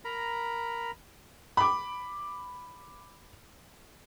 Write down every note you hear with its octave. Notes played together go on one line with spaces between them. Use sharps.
A#4 A#5 B5
B5 D6